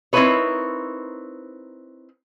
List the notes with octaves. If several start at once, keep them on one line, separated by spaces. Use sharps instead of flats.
C4 D#4 E4 A#4 B4 C#5